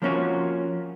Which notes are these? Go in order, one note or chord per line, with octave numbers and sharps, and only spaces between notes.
F3 A#3 C4 C#4 F4 F#4